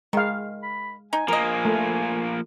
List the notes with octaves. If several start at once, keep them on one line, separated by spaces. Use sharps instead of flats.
D#3 G#3 F5
B5
D#4 G#5
F3 A#3 A#4 D#5
A3